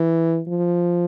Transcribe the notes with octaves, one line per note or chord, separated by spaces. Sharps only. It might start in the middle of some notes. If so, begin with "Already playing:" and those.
Already playing: E3
F3